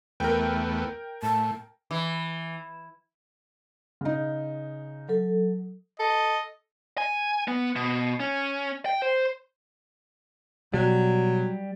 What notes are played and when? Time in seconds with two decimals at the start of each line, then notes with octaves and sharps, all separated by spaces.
0.20 E2 A3 B3 A#4 G5
1.23 A2 A5
1.91 E3
4.01 C#3 D#4
5.09 F#3 A4
6.00 A4 D#5
6.98 G#5
7.48 B3
7.76 B2
8.20 C#4
8.86 G5
9.02 C5
10.74 B2 F#3 G3